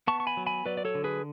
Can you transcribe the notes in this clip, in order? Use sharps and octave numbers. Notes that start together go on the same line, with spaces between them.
B3 A5 C#6
C#6
G#5 B5
F#3
G#5 B5
F#3 B4 D5
D5
A4 C#5
D3
G#4 B4